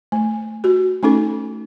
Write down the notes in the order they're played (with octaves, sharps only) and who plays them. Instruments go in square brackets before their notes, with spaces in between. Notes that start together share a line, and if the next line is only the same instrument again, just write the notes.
[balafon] A3
F#4 G4
A3 C#4 D#4 A4